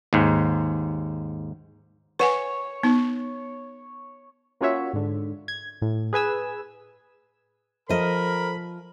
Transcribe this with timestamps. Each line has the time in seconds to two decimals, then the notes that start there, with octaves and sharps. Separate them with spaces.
0.13 D#2 G#2
2.19 B4 C#5 F#5 G#5
2.83 B3 D#4
4.61 A#3 C#4 F4 F#4 C#5 E5
4.93 G#2 D3
5.48 G#6
5.82 A2
6.13 G#4 B4 G#5 E6
7.89 F3 A4 A#4 C5 D#5 B5